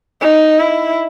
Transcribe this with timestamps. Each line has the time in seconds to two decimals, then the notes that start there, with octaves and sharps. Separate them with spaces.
0.21 D#4
0.60 E4